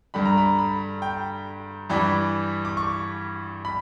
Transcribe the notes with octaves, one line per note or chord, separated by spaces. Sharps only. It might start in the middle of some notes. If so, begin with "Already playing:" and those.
G2 D3 G3 B5
A#5
B5
B5
G5
G2 E3 G3
D6
C#6
B5